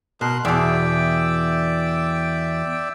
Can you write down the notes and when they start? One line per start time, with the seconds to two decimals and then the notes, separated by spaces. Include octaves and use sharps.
0.21 B2 A#4 C6 F#6
0.45 E2 B2 D5 E5 G5